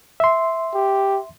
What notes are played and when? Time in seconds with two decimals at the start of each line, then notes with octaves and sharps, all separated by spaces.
0.20 E5 C6
0.75 G4